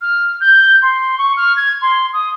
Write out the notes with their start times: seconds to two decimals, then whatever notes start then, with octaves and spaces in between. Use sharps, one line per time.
0.01 F6
0.40 G6
0.82 C6
1.18 C#6
1.36 F6
1.56 G#6
1.81 C6
2.13 D#6